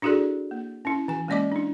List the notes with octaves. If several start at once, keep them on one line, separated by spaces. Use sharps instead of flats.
D4 E4 F#4 G#4 A4 D5
A#3
C#4 E4
E3 G#5
G#3 A#3 C#4 D5 D#5 D6
D4 E4